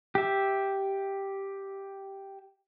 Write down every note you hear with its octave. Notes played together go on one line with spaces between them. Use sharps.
G4 E5